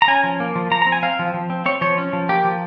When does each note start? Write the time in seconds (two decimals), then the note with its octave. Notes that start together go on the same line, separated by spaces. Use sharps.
0.02 A#5
0.08 C#4 G#5
0.24 F3
0.40 A#3
0.56 F3
0.71 F3 A#5
0.82 A#5
0.86 C4
0.92 G#5
1.03 C4 F5
1.19 F3
1.34 F3
1.50 C4
1.66 C4 C#5
1.81 F3 C#5
1.98 C#4
2.13 F3
2.29 A#3 G4
2.45 F3